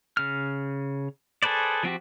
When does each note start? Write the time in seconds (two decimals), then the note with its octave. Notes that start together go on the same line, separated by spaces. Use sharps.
0.17 C#3 F6
1.43 G#4 A4 B4 C5 D5
1.83 F3 C4 F#4 G4